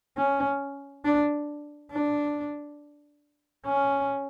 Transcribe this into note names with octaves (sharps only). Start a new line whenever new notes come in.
C#4
D4
D4
C#4